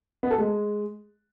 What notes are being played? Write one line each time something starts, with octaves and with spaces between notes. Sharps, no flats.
B3
A4
G#3